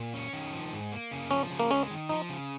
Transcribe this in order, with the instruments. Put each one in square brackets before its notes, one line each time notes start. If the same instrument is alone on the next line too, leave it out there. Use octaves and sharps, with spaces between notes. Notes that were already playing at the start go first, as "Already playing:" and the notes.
Already playing: [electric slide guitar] A#2
C#4
D#3
F3
G#2
A#3
C#3
[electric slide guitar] F3 [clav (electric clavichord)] C#4
[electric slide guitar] C#3
[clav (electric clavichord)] A#3
[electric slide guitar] G#3 [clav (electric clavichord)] C#4
[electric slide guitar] D#3
[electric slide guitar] F3 [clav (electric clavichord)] D#4
[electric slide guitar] C#3